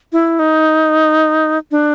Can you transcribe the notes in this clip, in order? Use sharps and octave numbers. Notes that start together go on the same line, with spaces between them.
E4
D#4
D4